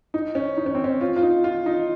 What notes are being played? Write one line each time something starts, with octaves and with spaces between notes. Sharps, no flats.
D#4
C#4
D#4
C#4
C4
C#4
F4
F4
D#4
F4
D#4